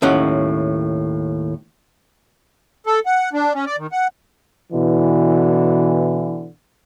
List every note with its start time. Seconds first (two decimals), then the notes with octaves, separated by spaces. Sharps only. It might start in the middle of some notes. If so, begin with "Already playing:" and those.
0.02 D#2 A2 C#4 F#5
2.87 A4
3.06 F#5
3.33 D4
3.54 C#4
3.66 D5
3.78 D#3
3.92 F#5
4.73 B2 D3 E3